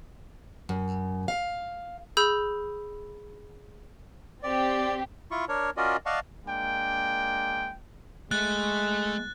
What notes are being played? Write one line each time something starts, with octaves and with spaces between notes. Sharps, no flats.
F#2
F5
G#4 B5 E6 G6
C4 G4 D5
E4 F4 C#6
D4 A#4 C#5
C#4 F4 F#4 A#4 D5 D#5
D5 D#5 F5 F#5 A5 C#6
G#3 A#3 D4 G5
G#3 A3 F#6 A6